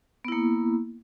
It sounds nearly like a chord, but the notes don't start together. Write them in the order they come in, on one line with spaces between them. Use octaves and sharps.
B3 E4 A#3